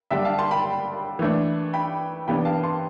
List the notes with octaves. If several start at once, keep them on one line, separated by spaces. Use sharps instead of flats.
D3 G3 D4 E5 G5
F5 A5
A5 C6
G5 B5
E3 A3 D4
G5 B5
C3 E3 B3 D4 G5 B5
F5 A5
A5 C6